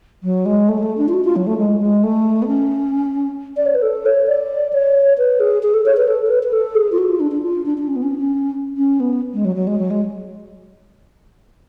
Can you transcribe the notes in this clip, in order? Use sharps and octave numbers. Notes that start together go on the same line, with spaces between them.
F#3
G#3
A3
G#3
A3
D4
F4
F#4
F4
F#3
A3
G#3
G#3
A3
B3
C#4
D5
C#5
B4
A4
C#5
D5
C#5
B4
G#4
G#4
A4
C#5
B4
A4
A4
B4
B4
A4
G#4
F4
F#4
F4
D4
D4
F4
D4
D4
C#4
B3
C#4
C#4
C#4
B3
G#3
F#3
F#3
G#3
F#3
G#3